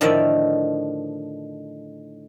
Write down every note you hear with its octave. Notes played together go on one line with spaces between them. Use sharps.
A2 D3 D#3 F3 D5 E5